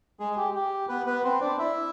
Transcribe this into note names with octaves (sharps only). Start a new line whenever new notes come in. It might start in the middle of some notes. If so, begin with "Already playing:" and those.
G#3 G#4
G4
G4
B3 B4
B3 B4
C4 C5
D4 D5
E4 E5